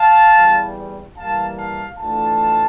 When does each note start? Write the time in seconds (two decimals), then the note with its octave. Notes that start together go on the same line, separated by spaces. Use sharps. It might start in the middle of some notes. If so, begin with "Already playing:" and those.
Already playing: F5 A5
0.34 E2 E3 G3
1.17 E3 G3 A#3 F5 A5
1.58 F5 A5
1.99 E3 A3 D4 F4 F5 A5